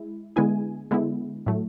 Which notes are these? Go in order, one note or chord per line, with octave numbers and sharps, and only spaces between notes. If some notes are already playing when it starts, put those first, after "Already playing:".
Already playing: G#3 E4
D3 G#3 B3 E4 G#4 G#5
D3 G#3 B3 E4
A2 F#3 A3